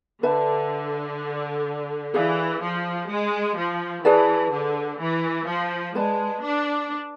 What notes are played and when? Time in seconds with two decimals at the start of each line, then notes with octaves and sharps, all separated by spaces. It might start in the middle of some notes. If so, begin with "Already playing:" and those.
0.23 D3 B4 E5 A5
2.14 E3 G#4 D5 F5
2.61 F3
3.09 G#3
3.56 F3
4.04 E3 G#4 B4 D5 A5
4.51 D3
4.99 E3
5.47 F3
5.95 G#3 B4 D5 A5
6.43 D4